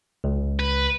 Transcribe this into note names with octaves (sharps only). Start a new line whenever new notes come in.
C#2
B4